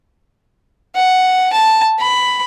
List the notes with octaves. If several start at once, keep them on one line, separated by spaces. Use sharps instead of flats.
F#5
A5
B5